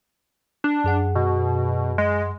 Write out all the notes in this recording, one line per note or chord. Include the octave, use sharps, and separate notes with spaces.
D4
F#2 G#4 F#5
B2
G#3